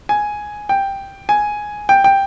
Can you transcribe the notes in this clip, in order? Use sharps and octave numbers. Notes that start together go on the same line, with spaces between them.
G#5
G5
G#5
G5
G5